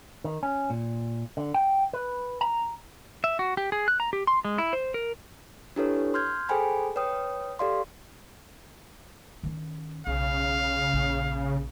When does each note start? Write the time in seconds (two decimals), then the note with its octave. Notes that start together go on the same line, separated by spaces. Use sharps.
0.24 D#3
0.43 C#4
0.70 A#2
1.37 D3
1.54 G5
1.93 B4
2.41 A#5
3.24 E5
3.39 F#4
3.57 G4
3.72 G#4
3.88 F#6
4.00 A#5
4.13 G4
4.27 C6
4.45 G#3
4.58 E4
4.73 C5
4.94 A#4
5.76 D4 E4 G4 A4 B4 C#5
6.14 C6 F6 G6 G#6
6.49 G#4 A4 C5 G5 G#5 B5
6.96 B4 C#5 G5 D#6
7.59 G4 A4 D5 F5 C6
9.43 D#3 C#4
10.07 B1 C#3 F5
10.93 A#1